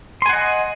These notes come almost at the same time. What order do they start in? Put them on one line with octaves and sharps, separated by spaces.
C6 G#5 F#5 D#5